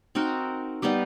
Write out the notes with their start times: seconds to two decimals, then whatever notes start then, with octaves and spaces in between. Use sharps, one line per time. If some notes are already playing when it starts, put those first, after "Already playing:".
0.15 C4 D#4 F#4 A#4
0.82 G3 B3 D#4 G4